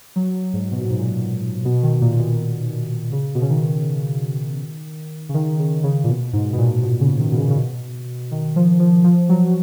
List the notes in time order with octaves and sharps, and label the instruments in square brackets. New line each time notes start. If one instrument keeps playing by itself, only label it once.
[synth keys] F#3
G#2
B2
A#2
G#2
A#2
B2
D#3
A#2
B2
C#3
B2
C#3
D#3
C#3
D#3
C#3
C#3
A#2
B2
G#2
B2
A#2
B2
C#3
D#3
B2
C#3
C#3
B2
D#3
F3
F3
F3
F#3